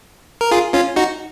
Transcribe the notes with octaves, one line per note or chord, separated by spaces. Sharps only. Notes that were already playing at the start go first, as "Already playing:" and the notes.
A#4
F4 G#4
C#4 F4
D#4 F#4